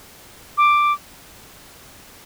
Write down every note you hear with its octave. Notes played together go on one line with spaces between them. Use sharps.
D6